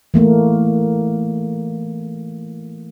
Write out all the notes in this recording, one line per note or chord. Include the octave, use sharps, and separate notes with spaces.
E3 A3 A#3